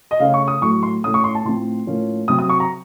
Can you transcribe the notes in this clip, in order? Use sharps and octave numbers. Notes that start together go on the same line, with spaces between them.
D#5
C#3 A3 C#4 F5
C#6
D#6
A2 F#3 A3 C#6
C6
A2 A3 C#4 D#6
C#6
C6
A5
A2 F3 C4 C6
A2 F3 A#3 C#4
C3 F#3 C4 D#6
D#6
C#6
A#5